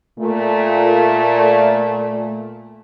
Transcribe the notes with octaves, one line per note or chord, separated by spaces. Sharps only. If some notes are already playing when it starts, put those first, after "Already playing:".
A#2 A3